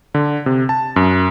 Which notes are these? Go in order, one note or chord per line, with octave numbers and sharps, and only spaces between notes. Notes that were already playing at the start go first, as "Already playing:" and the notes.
D3
C3
A5
F#2